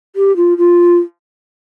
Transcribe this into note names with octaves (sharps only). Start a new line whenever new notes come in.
G4
F4
F4